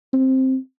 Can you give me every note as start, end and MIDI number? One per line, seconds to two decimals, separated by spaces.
0.13 0.56 60